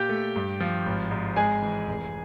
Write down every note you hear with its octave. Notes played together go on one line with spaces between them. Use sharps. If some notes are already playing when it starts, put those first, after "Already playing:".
Already playing: A#2 G4 G5
A3
G2
F3
G#1
G#2
G#3 G#4 G#5
E3
F1